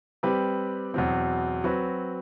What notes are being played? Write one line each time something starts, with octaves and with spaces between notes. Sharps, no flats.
G3 C4 G4 B4
E2 B2 F#3 C4
F#3 C4 F#4 B4